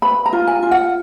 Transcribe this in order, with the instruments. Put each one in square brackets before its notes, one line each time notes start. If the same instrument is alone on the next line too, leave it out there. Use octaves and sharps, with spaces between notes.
[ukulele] B4 B5
A#5
F4
G#5
F4
F#5